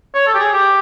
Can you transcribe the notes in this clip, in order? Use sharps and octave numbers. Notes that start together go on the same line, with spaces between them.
C#5
A4
G4
G#4
G4